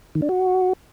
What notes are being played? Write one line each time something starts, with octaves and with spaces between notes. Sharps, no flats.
D#3
D4
F#4